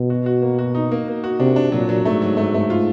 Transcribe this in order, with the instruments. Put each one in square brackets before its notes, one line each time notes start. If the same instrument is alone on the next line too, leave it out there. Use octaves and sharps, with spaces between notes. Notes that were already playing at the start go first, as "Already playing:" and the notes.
Already playing: [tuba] B2
[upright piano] F#4
F#4
A#3
F#4
D#4
A#3
A#3
F#4
[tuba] C3 [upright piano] D4
[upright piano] D4
[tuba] A#2 [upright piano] F#3
[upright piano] F#3
[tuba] G#2 [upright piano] A3
[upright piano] F#3
A3
A3
F4